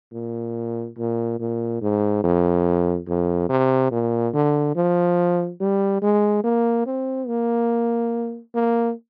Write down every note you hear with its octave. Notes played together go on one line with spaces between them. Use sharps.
A#2
A#2
A#2
G#2
F2
F2
C3
A#2
D3
F3
G3
G#3
A#3
C4
A#3
A#3